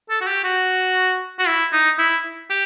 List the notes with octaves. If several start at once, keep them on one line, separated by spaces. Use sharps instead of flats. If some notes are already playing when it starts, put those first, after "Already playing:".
A4
F#4
G4
F#4
F#4
E4
D#4
E4
G4